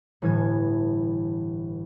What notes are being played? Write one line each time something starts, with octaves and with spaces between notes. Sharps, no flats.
G1 A2 E3 F6 G#6